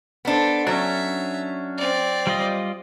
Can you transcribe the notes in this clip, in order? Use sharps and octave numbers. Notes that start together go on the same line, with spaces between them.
B3 D4 A4 C5
F#3 C#4 D4 E5
C4 D5
G3 F4 D#5